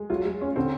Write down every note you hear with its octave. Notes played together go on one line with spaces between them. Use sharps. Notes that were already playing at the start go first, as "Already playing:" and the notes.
Already playing: G#3
F#3 F4
G#3
C#4
D3 C4